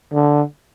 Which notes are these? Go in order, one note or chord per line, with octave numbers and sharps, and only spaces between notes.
D3